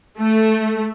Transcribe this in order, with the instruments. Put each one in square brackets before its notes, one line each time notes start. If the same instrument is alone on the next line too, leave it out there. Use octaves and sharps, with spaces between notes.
[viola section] A3